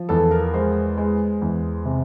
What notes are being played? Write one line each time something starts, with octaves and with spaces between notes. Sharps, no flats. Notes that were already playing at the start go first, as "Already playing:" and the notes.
Already playing: F3
E2 A4
A#4
G#3 C5
G#3
E2
C3